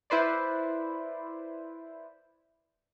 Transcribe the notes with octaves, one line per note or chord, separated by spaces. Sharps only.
E4 B4 C5 D5